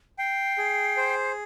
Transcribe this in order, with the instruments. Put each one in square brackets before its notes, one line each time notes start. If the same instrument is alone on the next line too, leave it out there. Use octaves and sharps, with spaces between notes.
[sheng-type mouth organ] G5 [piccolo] C7
[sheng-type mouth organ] G#4
C5